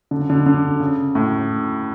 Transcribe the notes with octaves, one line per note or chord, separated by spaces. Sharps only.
D3
C#3
D3
D3
C#3
A2